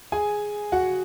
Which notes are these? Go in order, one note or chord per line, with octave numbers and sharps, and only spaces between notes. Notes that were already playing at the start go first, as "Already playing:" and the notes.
G#4 G#5
F#4 F#5